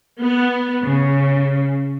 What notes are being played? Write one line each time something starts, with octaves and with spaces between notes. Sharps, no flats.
B3
C#3